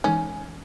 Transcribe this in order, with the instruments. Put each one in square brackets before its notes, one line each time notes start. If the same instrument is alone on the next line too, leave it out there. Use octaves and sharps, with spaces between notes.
[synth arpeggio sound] E3 G#3 D#4 [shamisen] C#4